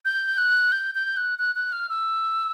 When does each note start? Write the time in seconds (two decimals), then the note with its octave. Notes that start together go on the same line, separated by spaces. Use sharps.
0.05 G6
0.38 F#6
0.72 G6
0.95 G6
1.17 F#6
1.39 F#6
1.56 F#6
1.72 F6
1.89 E6